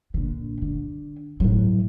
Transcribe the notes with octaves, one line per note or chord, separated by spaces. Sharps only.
A#1 D3
D3
A2 F#3